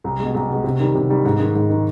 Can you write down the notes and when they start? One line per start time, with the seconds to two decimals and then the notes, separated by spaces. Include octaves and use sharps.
0.04 C2
0.20 B2 G#3
0.34 C2
0.49 B2 G#3
0.64 C3
0.79 D#3 G3
0.95 C3
1.09 D#3 G3
1.25 G#2
1.39 D#3 G#3
1.55 G#2
1.70 D#3 G#3